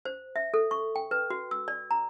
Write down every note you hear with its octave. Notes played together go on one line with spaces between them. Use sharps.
C5
E5
A4
C#6
G5
B4
F#4
E6
D5
A#5